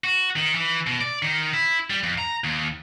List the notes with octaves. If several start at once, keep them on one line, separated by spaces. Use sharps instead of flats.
F#4
D#3
E3
B2
D5
D#3
E4
G3
F2
A#5
D#2